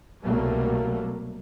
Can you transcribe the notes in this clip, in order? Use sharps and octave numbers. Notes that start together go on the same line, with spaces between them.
C2 B2 F#3 G3 A3 A#3